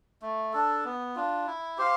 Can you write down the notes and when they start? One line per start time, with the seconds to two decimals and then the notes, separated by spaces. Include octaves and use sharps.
0.22 A3
0.53 D4 A4
0.85 B3
1.15 D4 F4
1.47 E4
1.78 G4 C5 F5